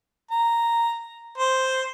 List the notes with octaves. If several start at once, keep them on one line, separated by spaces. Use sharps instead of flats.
A#5
C5